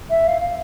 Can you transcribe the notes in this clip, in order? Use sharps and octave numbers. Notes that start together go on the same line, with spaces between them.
E5
F5
F5